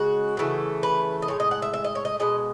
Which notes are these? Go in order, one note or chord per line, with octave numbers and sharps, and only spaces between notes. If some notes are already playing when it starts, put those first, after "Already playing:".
Already playing: C#3 G#3 F#4
C#3 E3 A3
B4
D#5
A2 G#3 C#5
D#5
F#5
E5
E5
D#5
C#5
D#5
B2 G#3 D#5